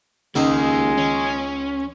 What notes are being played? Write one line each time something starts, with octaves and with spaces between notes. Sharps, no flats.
C#2 D#3 G#3 A#3 D#4 D#6
C#4